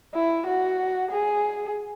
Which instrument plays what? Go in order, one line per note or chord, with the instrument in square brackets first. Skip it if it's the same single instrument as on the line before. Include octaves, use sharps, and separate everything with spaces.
[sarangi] E4
F#4
G#4